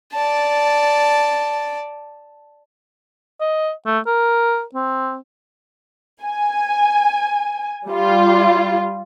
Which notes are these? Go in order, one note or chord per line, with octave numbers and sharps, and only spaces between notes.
D5 A5
D#5
A3
A#4
C4
G#5
G3 F4